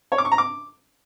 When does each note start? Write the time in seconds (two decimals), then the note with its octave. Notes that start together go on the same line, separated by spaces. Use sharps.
0.12 C#5
0.18 D6
0.25 C#6
0.32 A#5
0.38 D6